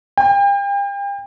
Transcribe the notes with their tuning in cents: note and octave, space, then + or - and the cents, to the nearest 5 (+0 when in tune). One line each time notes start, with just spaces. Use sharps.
G5 +40